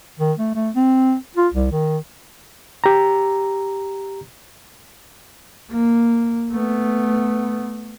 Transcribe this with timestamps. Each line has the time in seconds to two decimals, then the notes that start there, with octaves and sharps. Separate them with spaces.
0.19 D#3
0.39 A3
0.55 A3
0.76 C4
1.37 F4
1.54 C2
1.72 D#3
2.84 G4 A#5
5.71 A#3
6.51 A3 B3